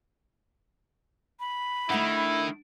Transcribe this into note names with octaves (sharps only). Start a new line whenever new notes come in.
B5
D#3 A3 D4 E4 F#5